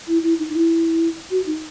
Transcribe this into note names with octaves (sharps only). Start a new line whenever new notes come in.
E4
E4
D#4
E4
F#4
D#4